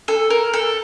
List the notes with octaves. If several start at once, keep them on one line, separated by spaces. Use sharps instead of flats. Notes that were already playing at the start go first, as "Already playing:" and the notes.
A4
A#4
A4